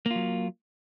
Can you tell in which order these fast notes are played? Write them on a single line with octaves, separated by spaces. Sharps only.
A#3 F4 F#3